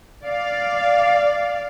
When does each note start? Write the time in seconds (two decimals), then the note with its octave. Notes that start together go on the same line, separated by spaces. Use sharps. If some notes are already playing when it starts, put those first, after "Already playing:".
0.24 D5 F5